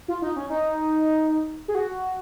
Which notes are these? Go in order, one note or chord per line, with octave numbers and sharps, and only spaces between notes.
F4
D#4
C#4
D#4
G#4
F#4